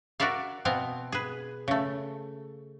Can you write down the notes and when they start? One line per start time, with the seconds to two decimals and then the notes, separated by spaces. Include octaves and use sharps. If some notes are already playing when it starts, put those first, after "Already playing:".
0.20 F#4 A#4 D5 E5 F5
0.65 B2 B3 C4 F5
1.12 G#4 B4
1.68 C#3 A3